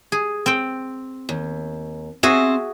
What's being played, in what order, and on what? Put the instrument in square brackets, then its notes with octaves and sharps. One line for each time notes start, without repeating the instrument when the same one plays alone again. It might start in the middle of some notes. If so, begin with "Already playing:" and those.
[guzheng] G#4
C4 C5 G5
[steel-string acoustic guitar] D#2
[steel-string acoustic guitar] C4 C5 [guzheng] F#4 G#4 E5